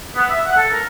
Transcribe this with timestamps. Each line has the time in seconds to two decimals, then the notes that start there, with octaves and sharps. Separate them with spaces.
0.15 B3
0.30 E5
0.44 F#5
0.57 A4
0.72 A#4